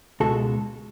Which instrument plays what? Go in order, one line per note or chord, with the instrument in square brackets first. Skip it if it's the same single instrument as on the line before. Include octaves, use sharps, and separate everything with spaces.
[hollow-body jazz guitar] C#2 B2 G#3 F#4 A4